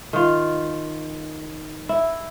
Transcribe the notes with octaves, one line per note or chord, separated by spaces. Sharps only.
D#3 F4
E4